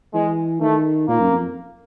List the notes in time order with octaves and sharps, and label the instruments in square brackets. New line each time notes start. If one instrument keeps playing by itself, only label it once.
[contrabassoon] E3 [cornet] G#3
[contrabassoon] D#3 [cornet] A3
[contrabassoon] A#2 [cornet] A#3
[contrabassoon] F#2
F2